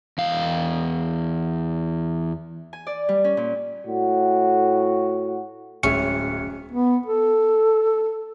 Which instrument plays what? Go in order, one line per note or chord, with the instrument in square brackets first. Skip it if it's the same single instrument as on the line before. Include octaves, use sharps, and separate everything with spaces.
[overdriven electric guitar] E2 F5
[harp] G#5
D5
G3
C#4
A#2
[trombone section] A2 F#4
[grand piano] D1 G#3 E5 [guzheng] C#4 [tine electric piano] C#7
[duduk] B3
A4